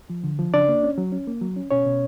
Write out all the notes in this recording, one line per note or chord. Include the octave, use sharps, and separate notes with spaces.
F3
D3
F3
C#3 D4 D5
A#3
C#4
F#3
C#4
A#3
F#3
C#4
B2 C#4 C#5
B2